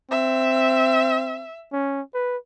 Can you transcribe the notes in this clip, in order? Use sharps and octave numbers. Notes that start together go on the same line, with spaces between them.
C4 E5
C#4
B4